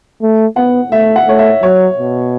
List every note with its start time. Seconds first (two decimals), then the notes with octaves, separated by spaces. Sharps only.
0.22 A3
0.56 B3 F#5
0.92 A3 E5
1.16 F#5
1.27 A3 C#5
1.39 E5
1.63 F#3 C#5
1.97 B2